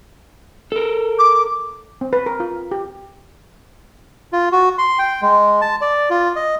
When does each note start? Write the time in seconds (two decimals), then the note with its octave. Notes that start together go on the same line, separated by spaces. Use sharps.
0.72 A4 A#4
1.19 D6
2.01 C4
2.13 B4
2.26 A#4
2.40 F4
2.71 G4
4.33 F4
4.52 F#4
4.78 C6
4.99 G5
5.22 G#3
5.61 A5
5.81 D5
6.10 F4
6.36 D#5